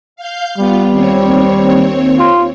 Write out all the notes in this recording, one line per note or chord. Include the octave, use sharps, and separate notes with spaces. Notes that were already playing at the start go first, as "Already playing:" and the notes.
F5 G6
G3 B3 F4
D#2 C4 C#5
F4